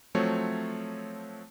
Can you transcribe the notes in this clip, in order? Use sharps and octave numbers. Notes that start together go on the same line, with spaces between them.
F3 F#3 A3 C4 C#5